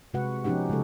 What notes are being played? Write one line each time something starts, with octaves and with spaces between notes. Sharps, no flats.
C3 G#3 F#4 B4 F#5
F3 B3 C#4 D#4 G4 F#5
C#3 G#3 A4